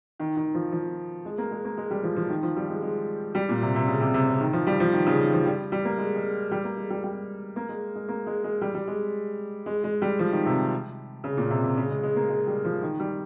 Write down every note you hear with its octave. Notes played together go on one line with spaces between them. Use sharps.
D#3
D#3
F3
F3
G#3
A#3
G#3
A#3
G#3
G3
F3
F3
D#3
F3
G3
G#3
G#3
G3
A#2
C3
C3
C#3
C3
C3
C#3
D#3
F3
G3
F3
D#3
C#3
D#3
F3
G3
G3
A#3
G#3
G#3
G3
A#3
G#3
G3
G3
A#3
G#3
G#3
A#3
G#3
G#3
G3
G3
G#3
G#3
G#3
G3
F3
D#3
C3
C#3
A#2
C3
C3
C#3
G#3
G#3
A#3
G#3
G3
F3
D#3
G3